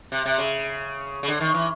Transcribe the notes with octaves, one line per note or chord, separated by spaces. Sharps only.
C3
C3
C#3
C#3
D3
D#3
E3